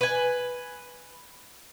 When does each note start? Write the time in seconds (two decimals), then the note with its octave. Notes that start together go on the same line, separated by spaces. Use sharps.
0.01 B4 G#5